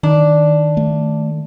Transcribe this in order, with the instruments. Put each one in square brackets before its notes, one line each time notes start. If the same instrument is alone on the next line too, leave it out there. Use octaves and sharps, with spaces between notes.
[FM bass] D#3 [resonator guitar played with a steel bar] D4
[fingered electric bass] A3